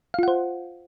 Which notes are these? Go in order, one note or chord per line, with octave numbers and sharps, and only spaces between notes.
F4 C5 F5 F#5